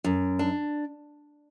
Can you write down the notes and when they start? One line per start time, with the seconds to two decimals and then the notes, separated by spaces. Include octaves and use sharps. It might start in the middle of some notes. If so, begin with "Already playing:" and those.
0.04 F#2
0.39 D4